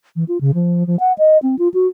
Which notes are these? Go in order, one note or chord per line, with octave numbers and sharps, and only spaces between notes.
E3
F4
C#3
F3
F3
F#5
D#5
C4
F4
F#4